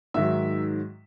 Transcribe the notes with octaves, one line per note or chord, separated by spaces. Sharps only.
G#2 D#3 F#3 E5